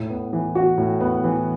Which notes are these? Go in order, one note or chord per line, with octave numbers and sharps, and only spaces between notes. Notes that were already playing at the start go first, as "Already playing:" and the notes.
Already playing: A2
B3
E3
F#4
A2
B3
E3